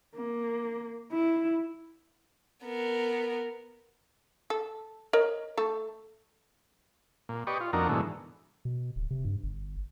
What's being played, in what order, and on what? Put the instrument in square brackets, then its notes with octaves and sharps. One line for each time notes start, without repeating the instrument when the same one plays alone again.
[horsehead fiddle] A#3
E4
[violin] B3 A#4
[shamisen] A4
A#4 C#5 D#5
A3 A4
[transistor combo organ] A#2
G4 B4 D5 D#5 C#6
F4
F2 A#3 D4 D#4 F#4 A#4
G#2 B2 D3 E3 F#3 A3
[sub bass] B2
D1
C3
G2
G1